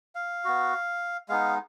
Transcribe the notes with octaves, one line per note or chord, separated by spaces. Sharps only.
F5
B3 F#4
G#3 B3 D#4 F5